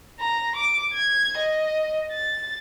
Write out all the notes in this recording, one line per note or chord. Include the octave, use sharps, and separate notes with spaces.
A#5
D6
G#6
D#5
A6